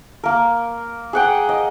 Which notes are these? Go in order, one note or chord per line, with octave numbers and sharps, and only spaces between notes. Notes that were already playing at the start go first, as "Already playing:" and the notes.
A#3 A#4
G#4 F#5 G5
D#5